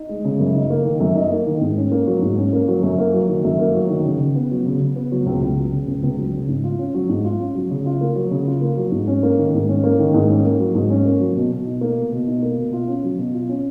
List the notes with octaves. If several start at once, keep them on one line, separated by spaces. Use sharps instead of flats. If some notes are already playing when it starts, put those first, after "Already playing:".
Already playing: D#4
G#3
C#3
F#2
D#4
A#3
D#3
F#2
D#4
A#3
D#3
G#2
C#4
A#3
F#3
G#2
C#4
A#3
F#3
F#2
A#3
F#3
D#3
F#2
A#3
F#3
D#3
C#3
C#3
B3
F#3
C#3
C#3
B3
F#3
C#2
C#2
F#3
C#3
C#2
C#2
F#3
C#3
G#2
F4
C#4
F#3
G#2
F4
C#4
F#3
C#3
F4
A#3
F#3
C#3
F4
A#3
F#3
G#2
C#4
A#3
D#3
G#2
C#4
A#3
D#3
G#2
C#4
A#3
F#3
G#2
C#4
A#3
F#3
B2
B2
D#4
A#3
B2
B2
D#4
A#3
B2
F4
C#4
F#3
B2
F4
C#4